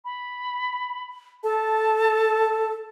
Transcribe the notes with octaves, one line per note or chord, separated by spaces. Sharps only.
B5
A4 A5